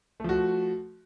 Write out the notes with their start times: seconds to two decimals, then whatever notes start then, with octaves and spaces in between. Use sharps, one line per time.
0.20 A3
0.24 F3
0.29 F#4